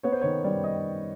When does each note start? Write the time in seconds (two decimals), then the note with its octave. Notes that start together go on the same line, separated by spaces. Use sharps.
0.03 B3 C#5
0.12 C5
0.21 D#3 C#5
0.44 G3 D5
0.64 D#5